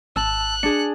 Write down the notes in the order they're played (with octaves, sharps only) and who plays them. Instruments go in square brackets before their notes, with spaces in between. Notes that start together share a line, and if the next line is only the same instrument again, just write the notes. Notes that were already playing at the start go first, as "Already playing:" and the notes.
[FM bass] G#1 [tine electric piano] A5 E6 [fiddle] F#6
[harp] D4 G#4 [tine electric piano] C#7